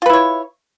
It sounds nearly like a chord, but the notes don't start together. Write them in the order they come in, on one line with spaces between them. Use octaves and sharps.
F4 B4 E4 C#5